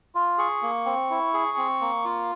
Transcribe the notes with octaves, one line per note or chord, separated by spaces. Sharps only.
F4
G#4 C#6
A#3
C4
E4
G#4
C4
A#3
F4